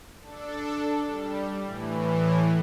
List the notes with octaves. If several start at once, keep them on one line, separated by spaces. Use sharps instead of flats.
D4 A4
G3
A2 E3